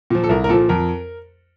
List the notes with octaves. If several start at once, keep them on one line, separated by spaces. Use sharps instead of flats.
A#2 F3
A4
C2 A#4
A#4
A#2 F3 A4
F2 A#4